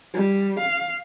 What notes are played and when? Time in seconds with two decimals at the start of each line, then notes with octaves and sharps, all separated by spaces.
0.14 G3
0.60 F5